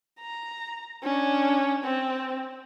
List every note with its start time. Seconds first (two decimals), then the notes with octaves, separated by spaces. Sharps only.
0.20 A#5
1.03 C#4 D4
1.84 C4